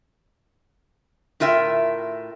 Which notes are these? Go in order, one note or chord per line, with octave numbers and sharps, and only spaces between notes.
A2 F4 A#4 E5 G5